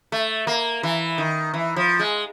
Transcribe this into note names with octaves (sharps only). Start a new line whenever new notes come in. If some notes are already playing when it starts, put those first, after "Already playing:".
A3
A#3
E3
D#3
E3
F3
G#3